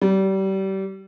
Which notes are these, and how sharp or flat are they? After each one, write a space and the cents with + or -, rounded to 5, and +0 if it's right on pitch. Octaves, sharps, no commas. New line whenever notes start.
G3 -30